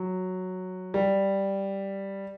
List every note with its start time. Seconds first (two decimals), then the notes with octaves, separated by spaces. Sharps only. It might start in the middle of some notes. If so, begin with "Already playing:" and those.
Already playing: F#3
0.94 G3